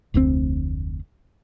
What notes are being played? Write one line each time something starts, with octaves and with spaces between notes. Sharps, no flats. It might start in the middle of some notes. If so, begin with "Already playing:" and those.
F1 D2 A#2 C4